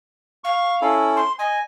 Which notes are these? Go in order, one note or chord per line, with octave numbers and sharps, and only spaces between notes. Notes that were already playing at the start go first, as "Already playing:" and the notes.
F5 C#6
C#4 E4 A4
C6
D#5 G#5